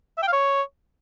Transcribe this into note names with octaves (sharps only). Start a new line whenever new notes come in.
E5
G5
F5
C#5